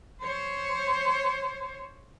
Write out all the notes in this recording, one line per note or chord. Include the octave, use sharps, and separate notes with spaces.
C5 C#5